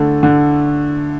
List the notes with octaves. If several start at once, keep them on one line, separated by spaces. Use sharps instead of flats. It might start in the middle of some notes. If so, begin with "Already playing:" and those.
Already playing: D3 A3
D3